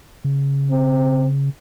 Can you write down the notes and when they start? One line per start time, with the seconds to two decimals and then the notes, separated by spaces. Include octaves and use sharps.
0.24 C#3
0.71 C4